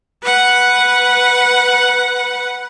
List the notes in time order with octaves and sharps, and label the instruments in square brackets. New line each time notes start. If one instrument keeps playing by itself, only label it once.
[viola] B4 F#5